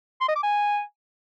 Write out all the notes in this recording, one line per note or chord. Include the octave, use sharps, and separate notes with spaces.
C6
D#5
D6
G#5